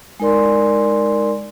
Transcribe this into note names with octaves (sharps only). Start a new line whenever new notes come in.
G#3 D#4 A#4 D5 C6